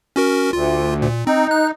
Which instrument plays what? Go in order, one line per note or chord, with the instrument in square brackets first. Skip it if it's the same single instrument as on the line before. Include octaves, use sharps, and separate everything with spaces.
[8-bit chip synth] C#4 F#4 A#4
[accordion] D2 [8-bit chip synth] F4
[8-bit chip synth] A#2
[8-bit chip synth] C4 [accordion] D#4
[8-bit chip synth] F#6